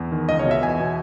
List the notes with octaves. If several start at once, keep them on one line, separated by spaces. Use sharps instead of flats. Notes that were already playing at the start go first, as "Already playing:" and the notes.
Already playing: E2
D#3
C#2 D#5
C#5
B2
E5
E2 G#5
B2